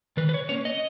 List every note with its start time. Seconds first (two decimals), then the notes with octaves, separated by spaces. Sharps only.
0.17 D#3 B4
0.29 B4
0.34 C#5
0.49 A#3 C#4 C#5
0.65 D#5